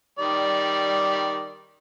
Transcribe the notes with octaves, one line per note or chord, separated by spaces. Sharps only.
D#3 G3 D5